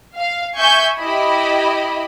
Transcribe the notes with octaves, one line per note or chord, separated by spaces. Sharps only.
F5
E5 G#5 C#6 G6
E4 G4 D#5 B5